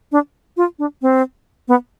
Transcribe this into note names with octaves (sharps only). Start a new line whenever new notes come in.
D4
F4
D4
C4
B3